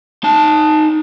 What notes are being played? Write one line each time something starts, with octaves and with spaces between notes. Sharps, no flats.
D#4 A5